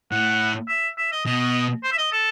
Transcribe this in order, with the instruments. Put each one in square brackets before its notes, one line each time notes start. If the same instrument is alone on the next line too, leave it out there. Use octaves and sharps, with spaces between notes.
[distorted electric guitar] A2 [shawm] F#5
[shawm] E5
E5
D#5
[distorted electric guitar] B2 [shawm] D#5
[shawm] C5
E5
D#5
A4